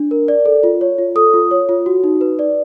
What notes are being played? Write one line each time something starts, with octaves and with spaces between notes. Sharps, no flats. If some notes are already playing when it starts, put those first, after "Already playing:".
Already playing: D4
A#4
D5
A4
F4
C#5
F4
A4 D#6
F4
C#5
F4
F#4
D#4
B4
D5